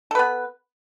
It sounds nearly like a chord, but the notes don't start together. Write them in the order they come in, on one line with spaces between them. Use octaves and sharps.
A4 B4 B3